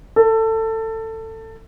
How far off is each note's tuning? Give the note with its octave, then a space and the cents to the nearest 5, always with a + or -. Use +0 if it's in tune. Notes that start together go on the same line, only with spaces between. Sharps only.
A4 +20